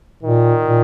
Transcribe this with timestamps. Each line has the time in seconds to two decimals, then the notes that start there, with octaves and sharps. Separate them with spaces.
0.23 A#2 D#3
0.66 A#2